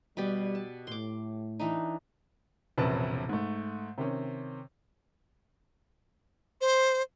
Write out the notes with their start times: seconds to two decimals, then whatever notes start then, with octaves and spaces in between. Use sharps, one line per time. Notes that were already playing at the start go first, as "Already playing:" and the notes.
0.17 B2 G3 G4 D5
0.55 A5
0.87 A2 C6 D6
1.60 E3 D4 D#4
2.78 E1 A#1 C3 C#4 B4 A5
3.29 G#2 A3
3.98 C3 D#3 C#4
6.61 C5